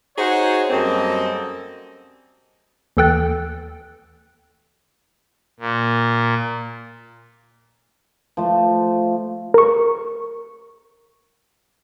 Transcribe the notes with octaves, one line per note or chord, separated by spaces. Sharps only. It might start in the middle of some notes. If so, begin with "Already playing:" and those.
D#4 F#4 G#4 C5 C#5
F#2 G3 A#3 C4 A4 D#5
D#2 E3 A4 G5 F#6 A6
A#2
F3 A3
A#4 C#6